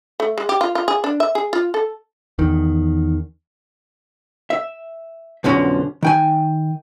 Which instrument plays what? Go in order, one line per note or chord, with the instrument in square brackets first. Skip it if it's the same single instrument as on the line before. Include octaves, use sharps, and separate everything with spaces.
[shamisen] A3
G#3
G4
F4
F4
G#4
D4
E5
G#4
F4
A4
[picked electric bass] E2 D#3
[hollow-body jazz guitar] E5
B1 F2 D3 F3 C#4 F#4
D#3 G5 G#5